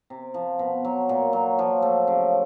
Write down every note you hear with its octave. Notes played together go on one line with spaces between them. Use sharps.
C3
F3
B2
F#3
A#2
F#3
F3
A3
C#3